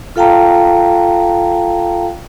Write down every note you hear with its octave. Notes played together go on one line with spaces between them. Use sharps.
F4 A4 F5 G5 A5 A#5